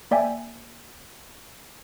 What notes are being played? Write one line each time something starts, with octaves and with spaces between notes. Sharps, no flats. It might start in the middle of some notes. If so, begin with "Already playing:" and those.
A#3 D5 E5 G5 G#5